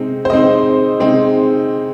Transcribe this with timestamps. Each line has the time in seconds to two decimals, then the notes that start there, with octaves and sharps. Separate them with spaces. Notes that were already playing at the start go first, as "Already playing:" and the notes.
Already playing: C3 G#3 C4 D#4
0.25 C5
0.30 C3 G#3 C4 D#4 D#5
1.00 C3 G#3 C4 D#4